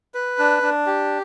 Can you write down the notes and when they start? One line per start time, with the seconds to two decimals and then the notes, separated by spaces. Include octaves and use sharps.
0.14 B4
0.39 D4
0.63 D4
0.86 G4